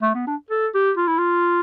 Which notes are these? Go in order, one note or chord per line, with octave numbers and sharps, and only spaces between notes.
A3
B3
D4
A4
G4
F4
E4
F4